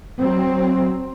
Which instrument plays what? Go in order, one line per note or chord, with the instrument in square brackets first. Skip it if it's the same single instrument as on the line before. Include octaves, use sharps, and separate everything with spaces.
[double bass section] F#3 C4